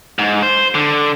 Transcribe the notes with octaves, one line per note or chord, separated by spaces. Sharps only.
G#2
C5
D3